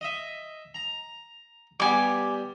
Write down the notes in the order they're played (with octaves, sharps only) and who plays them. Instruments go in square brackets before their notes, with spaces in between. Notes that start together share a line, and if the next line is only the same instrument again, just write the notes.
[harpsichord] D#5 E5
A#5
[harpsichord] G3 B3 G4 [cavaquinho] G#5 D6